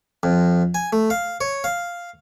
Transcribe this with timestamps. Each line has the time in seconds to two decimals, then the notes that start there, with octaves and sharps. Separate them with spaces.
0.23 F2
0.74 G#5
0.93 A3
1.10 F5
1.41 C#5
1.64 F5